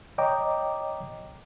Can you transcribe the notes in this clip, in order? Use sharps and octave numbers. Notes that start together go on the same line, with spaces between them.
C#5 D#5 G5 A#5 D6